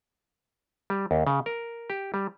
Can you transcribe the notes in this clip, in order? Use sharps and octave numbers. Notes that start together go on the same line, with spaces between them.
G3
D#2
C#3
A#4
G4
G3